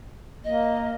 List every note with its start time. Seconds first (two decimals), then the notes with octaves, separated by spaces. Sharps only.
0.44 A#3 D#5